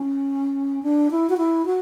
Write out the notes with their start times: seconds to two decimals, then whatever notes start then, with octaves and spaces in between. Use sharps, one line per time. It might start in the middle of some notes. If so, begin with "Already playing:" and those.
Already playing: C#4
0.83 D4
1.11 E4
1.30 F#4
1.37 E4
1.66 F#4